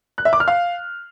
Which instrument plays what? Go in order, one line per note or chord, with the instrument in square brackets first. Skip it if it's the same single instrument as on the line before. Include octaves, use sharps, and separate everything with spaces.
[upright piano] F#6
E5
D6
F6
F5